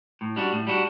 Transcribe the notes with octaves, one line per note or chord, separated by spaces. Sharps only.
A2
G3 D4 F#4
A2
G3 D4 F#4